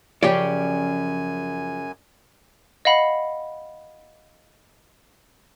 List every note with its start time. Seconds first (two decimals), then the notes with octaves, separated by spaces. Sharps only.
0.23 F#2 C#3 F3 G4 C#5 D5 G#5
2.85 D#5 F5 F#5 B5